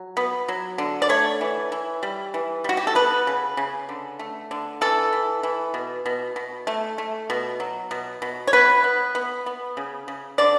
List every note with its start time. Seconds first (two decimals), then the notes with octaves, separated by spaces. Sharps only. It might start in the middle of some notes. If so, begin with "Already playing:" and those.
Already playing: F#3
0.17 B3
0.48 F#3
0.78 D3
1.02 D5
1.09 A3 C#5
1.41 E3
1.72 E3
2.03 G3
2.34 E3
2.64 G3 F#4
2.77 G4
2.87 A4
2.95 B3 B4
3.27 C#3
3.57 C#3
3.89 D3
4.19 A3
4.51 D3
4.81 E3 A4
5.13 E3
5.43 E3
5.74 B2
6.06 B2
6.36 B2
6.67 A3
6.98 A3
7.30 B2
7.60 F#3
7.91 B2
8.22 B2
8.47 C#5
8.53 B3 B4
8.84 B3
9.15 B3
9.46 B3
9.77 C#3
10.08 C#3
10.38 D3 D5